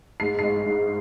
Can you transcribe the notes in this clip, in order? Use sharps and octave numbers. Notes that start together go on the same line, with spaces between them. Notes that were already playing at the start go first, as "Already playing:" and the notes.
G#2 C7
G#3 C7
G#2